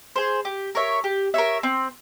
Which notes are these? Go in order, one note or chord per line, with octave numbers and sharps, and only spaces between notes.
G#4 C5
G4
A#4 C#5 E5
G4
A#4 C#5 E5
C4